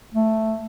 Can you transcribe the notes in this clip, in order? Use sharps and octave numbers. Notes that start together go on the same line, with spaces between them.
A3